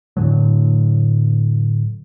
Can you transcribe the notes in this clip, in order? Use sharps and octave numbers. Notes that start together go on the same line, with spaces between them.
A2 D3 F#3